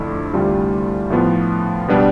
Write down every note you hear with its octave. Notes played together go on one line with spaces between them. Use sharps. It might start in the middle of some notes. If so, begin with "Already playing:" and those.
Already playing: F2 D3 A3 E4
D2 C3 G3 D4 F4
A2 F3 B3 F4
B2 G3 B3 D4